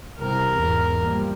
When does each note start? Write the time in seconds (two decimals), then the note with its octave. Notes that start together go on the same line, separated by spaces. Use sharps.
0.19 C2 C3 A#4
0.56 E2 G#2
1.00 F3 G3 A#3